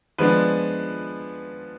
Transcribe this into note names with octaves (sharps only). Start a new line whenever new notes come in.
F3 G#3 B3 D4 B4